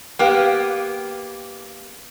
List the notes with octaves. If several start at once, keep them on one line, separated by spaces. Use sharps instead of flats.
A#3 B3 G4